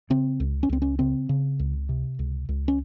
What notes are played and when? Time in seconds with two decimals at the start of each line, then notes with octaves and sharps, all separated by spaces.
0.10 C#3 C4
0.40 C#2
0.63 C#4
0.69 C#2 C4
0.82 C#4
0.99 C#3 C4
1.29 C#3
1.59 C#2
1.89 C3
2.19 C#2
2.49 C#2
2.68 C#4